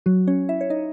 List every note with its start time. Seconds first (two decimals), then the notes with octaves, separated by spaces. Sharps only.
0.06 F#3 F#4
0.27 C#4 C#5
0.49 E4 E5
0.61 C#5
0.70 D#4 D#5